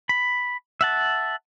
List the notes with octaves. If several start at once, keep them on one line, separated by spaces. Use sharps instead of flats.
B5
E5 F#5 A5